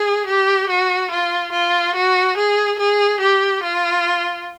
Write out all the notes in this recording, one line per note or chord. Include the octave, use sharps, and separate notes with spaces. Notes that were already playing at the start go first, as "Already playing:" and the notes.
Already playing: G#4
G4
F#4
F4
F4
F#4
G#4
G#4
G4
F4